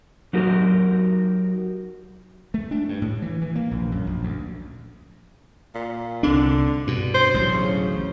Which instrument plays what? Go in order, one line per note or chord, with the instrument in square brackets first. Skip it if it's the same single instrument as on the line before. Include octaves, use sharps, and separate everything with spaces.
[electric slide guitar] F#3 D#4 F#4 G4 A#4
[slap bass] A3
D4
G2
A2
E3
E3
A#3
A#1
F#2
A#1
D2
[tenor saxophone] A#2
[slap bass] C2 C4 D4 [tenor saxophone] D3
[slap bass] G2 B2
[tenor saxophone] C5
[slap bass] A1 D2 F#3
[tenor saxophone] C#3